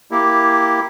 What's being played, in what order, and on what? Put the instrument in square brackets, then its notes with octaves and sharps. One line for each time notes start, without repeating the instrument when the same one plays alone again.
[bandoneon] A#3 E4 G4